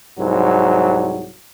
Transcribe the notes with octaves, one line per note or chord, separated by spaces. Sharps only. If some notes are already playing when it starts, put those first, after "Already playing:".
C2 G#2 F#3